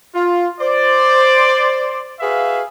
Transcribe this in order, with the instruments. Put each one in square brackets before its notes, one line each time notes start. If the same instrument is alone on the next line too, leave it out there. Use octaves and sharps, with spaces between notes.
[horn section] F4
C5 D5
F#4 G#4 B4 E5 F5